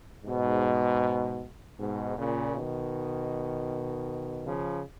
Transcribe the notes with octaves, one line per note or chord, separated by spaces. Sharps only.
G#2 B2
G#2 B2
A#2 C#3
B2 D#3
C#3 F3